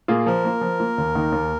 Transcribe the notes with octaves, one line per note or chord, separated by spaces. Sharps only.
A#2 A#3 F4 G#4
F3 A#4
A#3 F4
F3
A#3 F4
D#2
D#3 A#3 D#4
D#2